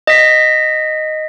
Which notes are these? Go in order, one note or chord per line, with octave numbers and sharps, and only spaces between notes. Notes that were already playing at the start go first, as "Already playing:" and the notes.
D#5 B6